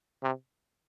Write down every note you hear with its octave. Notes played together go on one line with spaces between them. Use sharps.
C3